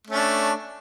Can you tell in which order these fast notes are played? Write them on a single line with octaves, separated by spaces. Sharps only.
A3 C#4 D4